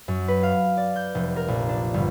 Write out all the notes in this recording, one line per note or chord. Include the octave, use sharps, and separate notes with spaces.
F#2
B4
F5
D5
G6
F1
A#4
A#1
D4
G1